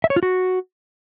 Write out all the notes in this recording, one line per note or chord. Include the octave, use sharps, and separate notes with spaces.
E5
C#5
F4
F#4